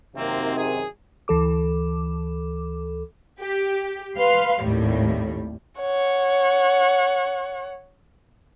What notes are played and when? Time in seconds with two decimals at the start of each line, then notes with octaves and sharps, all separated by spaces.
0.16 F#2 C3 D#3 A#3 C4
0.56 G#4
1.28 D2 E3 A4 D6
3.40 G4
4.17 B4 F5 C6
4.62 G#1 D#2 A2 G3
5.80 C#5 F#5